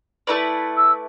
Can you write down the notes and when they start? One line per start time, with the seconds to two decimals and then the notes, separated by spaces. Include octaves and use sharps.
0.27 A3 E4 B4 D5
0.77 E6